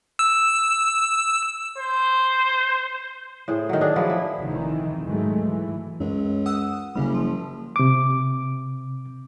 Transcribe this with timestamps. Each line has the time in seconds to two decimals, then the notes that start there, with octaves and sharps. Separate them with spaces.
0.19 E6
1.78 C5
3.48 A2 G#4 C5
3.69 D#3 F#3
3.81 D4 G#4
3.96 F3 F#3 E4 G#4
4.10 E4
4.40 F1 A#2 D#3 E3
5.04 G#2 D#3 F#3 G#3 A3
5.45 E3
6.00 C#2 F#2
6.46 F#5 D#6 E6
6.95 F#1 C#3 G3
7.14 F3
7.76 C3 D6